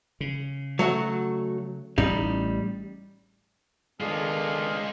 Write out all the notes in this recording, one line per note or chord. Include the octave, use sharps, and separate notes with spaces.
C#3
F#3 A3 F#4
A1 A2 G3 C#4 D#4
D#3 G#3 B3 D4 F4 G#4 A4 F6